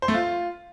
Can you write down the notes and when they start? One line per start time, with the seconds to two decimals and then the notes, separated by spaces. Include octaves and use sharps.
0.02 C5
0.08 A3
0.14 F4